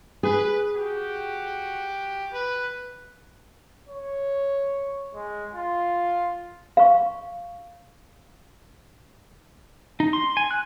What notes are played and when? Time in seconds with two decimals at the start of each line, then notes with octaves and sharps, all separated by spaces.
0.23 G#4 B4
0.76 F#4 G4
2.33 B4
3.88 C#5
5.14 G#3
5.55 F4
6.77 F5 C#6
10.00 D#4
10.13 C6
10.37 G#5
10.51 F#6